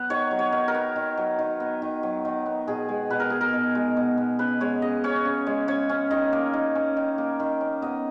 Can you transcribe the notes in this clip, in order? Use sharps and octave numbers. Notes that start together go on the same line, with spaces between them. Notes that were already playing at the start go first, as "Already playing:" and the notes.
Already playing: F#3 B3 F#5
D#3 C#5
F#3
C#5
D#3
A#4
B3
D#3
F#3
D#3
B3
D#3
F#3
D#3
B3
B2 G#4
G#3
B2 B4
A#4
B3 G#4
A#4
B2
G#3
B2
B3
C#3 B4
G#3 C#5
C#3 D#5
C#4 C#5
C#3
G#3
C#3 C#5
C#4
D#3 D#5
A#3
D#3
C#4
D#3
A#3
D#3
C#4
B3 D#5